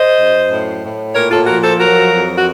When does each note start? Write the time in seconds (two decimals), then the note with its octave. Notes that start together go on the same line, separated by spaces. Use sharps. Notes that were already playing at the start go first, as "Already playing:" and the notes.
Already playing: C5 D#5
0.16 F#2
0.48 A2
0.82 A2
1.14 A#2 A#4 C#5
1.30 F4 A4
1.47 F3 F#4 A#4
1.64 A4 C5
1.80 F#3 F#4 A#4
2.13 F2
2.36 F#4